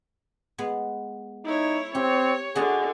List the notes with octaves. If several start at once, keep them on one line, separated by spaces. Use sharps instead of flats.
G#3 B3
D#4 E4 C#5
C4 G4 C#5
D3 F#4 G#4 D#5 A5